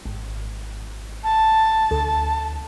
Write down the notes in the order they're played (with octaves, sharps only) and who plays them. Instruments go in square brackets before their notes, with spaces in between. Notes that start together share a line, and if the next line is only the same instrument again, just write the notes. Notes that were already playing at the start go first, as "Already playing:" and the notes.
[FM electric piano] G#1
[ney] A5
[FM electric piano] D2 A4